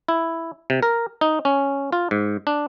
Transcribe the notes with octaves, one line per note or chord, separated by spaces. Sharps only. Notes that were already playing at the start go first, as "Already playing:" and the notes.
E4
C3
A#4
D#4
C#4
F4
G#2
D4